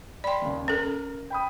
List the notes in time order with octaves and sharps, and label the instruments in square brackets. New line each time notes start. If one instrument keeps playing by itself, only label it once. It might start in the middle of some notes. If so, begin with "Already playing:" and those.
[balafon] D5 G5 [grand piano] B5 C6
[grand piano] D#2 C#3
[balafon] C#4 A4 [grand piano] A#4
[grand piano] G5 B5 D#6